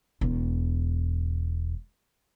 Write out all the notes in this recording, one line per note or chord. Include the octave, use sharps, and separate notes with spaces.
E1 E2